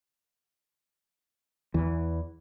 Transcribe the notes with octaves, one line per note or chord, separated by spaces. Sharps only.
E2 E3